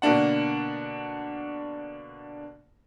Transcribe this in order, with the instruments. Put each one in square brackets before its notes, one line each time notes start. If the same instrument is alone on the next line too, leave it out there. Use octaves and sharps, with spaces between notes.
[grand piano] B2 D3 A#3 D4 F#5